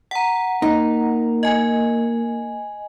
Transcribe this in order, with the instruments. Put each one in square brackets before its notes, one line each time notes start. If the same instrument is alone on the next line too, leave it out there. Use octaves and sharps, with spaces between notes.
[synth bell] F#5 A#5
[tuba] A#3 [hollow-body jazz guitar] D#4
[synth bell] D#5 G#5